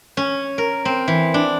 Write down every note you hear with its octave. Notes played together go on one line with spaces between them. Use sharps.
C#4
A#4
C4
E3
D4